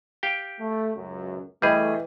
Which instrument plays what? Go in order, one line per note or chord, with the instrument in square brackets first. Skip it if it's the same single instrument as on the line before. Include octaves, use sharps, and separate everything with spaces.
[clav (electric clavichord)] G4 F5 G5
[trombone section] A3
C#2 F#2
[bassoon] E3 [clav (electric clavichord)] G3 G#4 [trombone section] A3 [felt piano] D#5 G5 B5